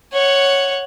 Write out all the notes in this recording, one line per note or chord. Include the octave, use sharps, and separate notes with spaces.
C#5 F#5